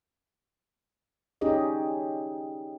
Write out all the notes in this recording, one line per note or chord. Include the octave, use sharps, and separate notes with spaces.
C#4 D#4 G4 G#4 D#5